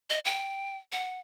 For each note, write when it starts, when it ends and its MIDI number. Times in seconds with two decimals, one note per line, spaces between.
0.10 0.19 75
0.25 0.77 79
0.92 1.20 78